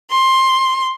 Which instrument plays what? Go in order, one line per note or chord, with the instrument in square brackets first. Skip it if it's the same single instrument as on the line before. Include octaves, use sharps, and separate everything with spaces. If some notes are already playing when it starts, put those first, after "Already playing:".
[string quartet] C6